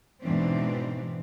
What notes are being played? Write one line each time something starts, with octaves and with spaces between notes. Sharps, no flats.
E2 G#2 B2 E3 C4 D4